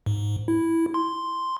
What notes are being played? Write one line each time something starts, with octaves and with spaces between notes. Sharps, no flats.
G#2
E4
C6